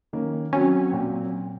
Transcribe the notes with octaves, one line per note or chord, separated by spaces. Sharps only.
D#3 A#3 C#4
F#3 C4 C#4 F#4
A#2 F#3 C4